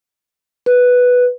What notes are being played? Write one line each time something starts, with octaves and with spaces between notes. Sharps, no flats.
B4